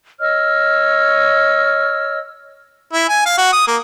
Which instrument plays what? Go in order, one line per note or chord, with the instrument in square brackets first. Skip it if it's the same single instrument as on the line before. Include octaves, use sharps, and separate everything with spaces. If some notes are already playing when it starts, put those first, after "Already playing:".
[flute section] C#5 D#5 E6 F6
[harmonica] E4
G#5
F5
F#4
D#6
A#3